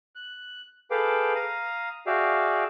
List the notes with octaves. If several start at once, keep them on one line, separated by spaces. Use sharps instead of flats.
F#6
G#4 A4 B4 F5 G5 D6
F5 A#5 D#6
F#4 G#4 D5 E5 F5 G5